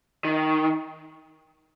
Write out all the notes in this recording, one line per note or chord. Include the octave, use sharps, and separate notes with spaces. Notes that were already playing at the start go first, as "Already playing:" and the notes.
D#3